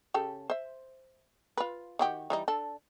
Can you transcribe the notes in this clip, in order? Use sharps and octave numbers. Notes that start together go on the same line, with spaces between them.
C#3 G4 A4
C5 E5
F4 B4
D#3 F#4 G4
E3 G3 D#4
D4 A4